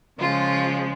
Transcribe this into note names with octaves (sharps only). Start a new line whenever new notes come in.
C#3 F3 G#3 F4